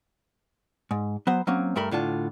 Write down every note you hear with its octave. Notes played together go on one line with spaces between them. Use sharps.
G#2
F#3 B3 C5
F#3 A#3 C4 C#4
G2 A3 A#4 B5
A2 D3 F4 A5